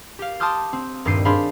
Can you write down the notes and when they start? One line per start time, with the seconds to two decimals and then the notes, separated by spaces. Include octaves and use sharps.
0.19 G4 F5
0.40 A5 C6 D6 D#6 F6 G6
0.73 C4
1.05 D#1 G2 G4 C7 D#7
1.25 D4 G#4 C5 F5 B5 C6